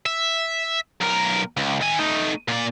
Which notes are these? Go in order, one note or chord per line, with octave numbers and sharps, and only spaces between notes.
E5
B1 A#4
C#2
D#3 G#5
A3 D#4
A#2 D5